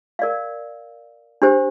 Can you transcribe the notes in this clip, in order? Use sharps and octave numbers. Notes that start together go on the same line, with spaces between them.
A#4 D5 F5
D4 G4 C5